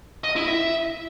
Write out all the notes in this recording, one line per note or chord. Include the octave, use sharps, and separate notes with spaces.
D#5
E4
E5